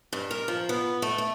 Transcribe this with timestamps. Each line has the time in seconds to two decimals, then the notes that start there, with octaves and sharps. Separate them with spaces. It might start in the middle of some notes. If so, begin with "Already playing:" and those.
0.13 G2
0.31 A#4
0.48 F3
0.69 B3
1.02 A3
1.18 A3